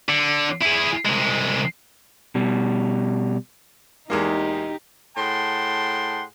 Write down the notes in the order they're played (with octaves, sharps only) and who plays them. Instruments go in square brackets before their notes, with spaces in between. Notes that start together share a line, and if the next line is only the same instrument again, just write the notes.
[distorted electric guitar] D3
E4 G#4
C2 G#3
[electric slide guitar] B2 G3
[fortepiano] E2 G#3 A#3 [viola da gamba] D#4 G4
[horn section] A2 G#4 F#5 G5 A5 C6